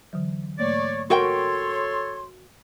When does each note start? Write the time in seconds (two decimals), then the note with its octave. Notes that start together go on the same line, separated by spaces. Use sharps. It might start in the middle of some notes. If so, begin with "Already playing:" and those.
0.13 D3 E3 F#3
0.59 G#2 A3 A#3 C#5 D5 C#6
1.10 F#4 A4 A#4 C#5 G5 C6